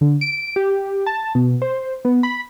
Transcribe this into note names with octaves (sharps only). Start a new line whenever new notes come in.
D3
D7
G4
A5
B2
C5
B3
B5